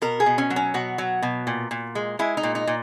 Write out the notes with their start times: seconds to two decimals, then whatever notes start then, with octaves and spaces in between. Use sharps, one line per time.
0.02 B2 A#4
0.20 G#4
0.26 B2
0.38 C#4
0.50 F#3
0.56 C#4
0.74 B2 F#4
0.98 F#3
1.22 B2
1.47 A#2
1.71 A#2
1.95 G#3
2.19 G#3 E4
2.37 D#4
2.43 A#2
2.55 D#4
2.67 A#2